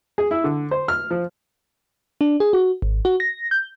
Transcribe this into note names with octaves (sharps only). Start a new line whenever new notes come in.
G#4
E4
D3
C5
F6
F3
D4
G#4
F#4
G#1
F#4
A#6
G6